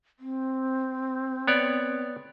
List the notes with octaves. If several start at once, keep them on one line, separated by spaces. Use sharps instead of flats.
C4
B3 C#5 D5